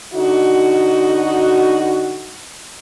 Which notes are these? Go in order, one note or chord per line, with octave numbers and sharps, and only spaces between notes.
D3 D#4 F#4